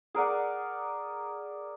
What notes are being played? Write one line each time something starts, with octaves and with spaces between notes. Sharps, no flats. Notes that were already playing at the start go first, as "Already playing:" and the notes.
G#4 A#4 D5 F#5